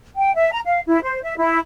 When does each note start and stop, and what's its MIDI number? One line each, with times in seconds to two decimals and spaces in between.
0.16 0.33 79
0.35 0.51 76
0.51 0.59 82
0.64 0.81 77
0.87 1.00 64
1.02 1.21 72
1.23 1.35 76
1.37 1.59 64